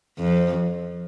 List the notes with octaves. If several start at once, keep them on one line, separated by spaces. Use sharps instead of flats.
F2